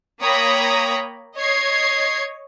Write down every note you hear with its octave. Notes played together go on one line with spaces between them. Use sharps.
A#3 C#5 G5 A#5 B5 D#6
C#5 D#5 G#6 C7